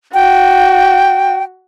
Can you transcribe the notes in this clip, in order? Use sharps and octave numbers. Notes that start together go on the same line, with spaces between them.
F#4 G5